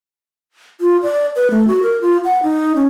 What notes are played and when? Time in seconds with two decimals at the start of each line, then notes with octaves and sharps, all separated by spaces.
0.81 F4
1.03 D5
1.36 B4
1.50 A3
1.68 F#4
1.83 A#4
2.01 F4
2.25 F#5
2.43 D#4
2.75 C#4